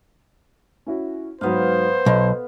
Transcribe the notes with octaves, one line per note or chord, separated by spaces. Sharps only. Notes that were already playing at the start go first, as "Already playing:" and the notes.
C#4 E4 F#4
G#2 F#3 B3 C5 F5
B1 A4